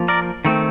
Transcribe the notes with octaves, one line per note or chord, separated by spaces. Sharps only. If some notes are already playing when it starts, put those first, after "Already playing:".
Already playing: F3 A#3
A#4 D5
D#3 A3 C4